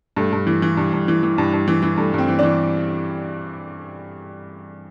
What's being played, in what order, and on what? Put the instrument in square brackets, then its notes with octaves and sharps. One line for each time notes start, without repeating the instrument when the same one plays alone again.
[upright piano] G2 A3
G2
E3
E3
G2
G2
E3
E3
G2
G2
E3
E3
G2 A3
G2 C4
E3
E3 D4